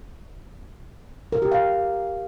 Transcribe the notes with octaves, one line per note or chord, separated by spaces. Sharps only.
A#4
G4
F5